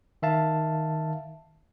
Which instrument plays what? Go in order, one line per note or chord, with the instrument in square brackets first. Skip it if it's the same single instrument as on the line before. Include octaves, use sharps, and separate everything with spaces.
[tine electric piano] D#3 E5 F5 A5